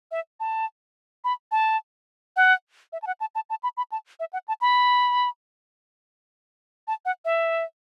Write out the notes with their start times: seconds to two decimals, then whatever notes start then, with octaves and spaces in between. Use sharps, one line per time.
0.11 E5
0.40 A5
1.24 B5
1.52 A5
2.36 F#5
2.93 E5
3.02 A5
3.07 F#5
3.20 A5
3.35 A5
3.50 A5
3.63 B5
3.77 B5
3.92 A5
4.20 E5
4.33 F#5
4.48 A5
4.61 B5
6.88 A5
7.05 F#5
7.25 E5